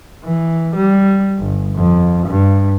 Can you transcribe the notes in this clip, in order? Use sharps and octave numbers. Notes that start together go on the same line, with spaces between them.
E3
G3
G1
F2
G2